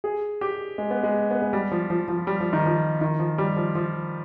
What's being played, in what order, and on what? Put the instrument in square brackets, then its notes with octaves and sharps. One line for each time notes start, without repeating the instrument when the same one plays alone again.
[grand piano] G#4
G4
G#3
B3
G#3
B3
G#3
G3
F3
F3
F3
G3
F3
D#3
F3
D#3
F3
G3
F3
F3